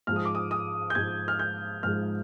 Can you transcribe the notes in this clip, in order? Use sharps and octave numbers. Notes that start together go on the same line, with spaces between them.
G#2 F3 G#3 F6
D#6
D6
D#6
D#6
G6
G#2 F3 G#3 G#6
F6
G6
G#2 F3 G#3 F6